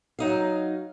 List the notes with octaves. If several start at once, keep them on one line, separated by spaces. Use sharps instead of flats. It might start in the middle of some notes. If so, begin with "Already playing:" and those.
F#3 D#4 F5